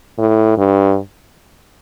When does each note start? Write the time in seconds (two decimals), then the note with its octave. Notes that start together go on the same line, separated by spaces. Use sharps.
0.19 A2
0.58 G2